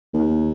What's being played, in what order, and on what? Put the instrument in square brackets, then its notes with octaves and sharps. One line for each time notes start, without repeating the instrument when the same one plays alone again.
[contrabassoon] D#2